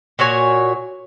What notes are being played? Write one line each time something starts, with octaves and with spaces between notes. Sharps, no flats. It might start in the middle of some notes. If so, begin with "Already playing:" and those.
A#2 F#4 C#5 G#5